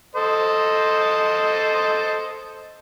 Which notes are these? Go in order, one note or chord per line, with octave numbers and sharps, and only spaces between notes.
A4 C5 D#5